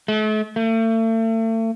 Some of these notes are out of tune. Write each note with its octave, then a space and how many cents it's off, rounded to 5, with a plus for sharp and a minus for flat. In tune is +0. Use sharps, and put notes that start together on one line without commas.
A3 -40
A3 +40